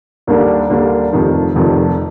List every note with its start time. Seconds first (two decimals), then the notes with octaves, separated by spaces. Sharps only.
0.27 D#2 D3 G3 A#3 D4
0.70 D#2 D3 G3 A#3 D4
1.13 F1 F2 C3 D#3
1.55 F1 F2 C3 D#3